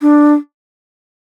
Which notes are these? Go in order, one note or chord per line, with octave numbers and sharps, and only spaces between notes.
D4